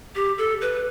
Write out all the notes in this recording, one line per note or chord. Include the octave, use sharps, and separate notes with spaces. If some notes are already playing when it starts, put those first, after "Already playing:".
G4
A4
B4